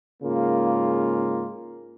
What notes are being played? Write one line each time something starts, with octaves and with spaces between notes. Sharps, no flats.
G#2 C#3 A#3 F4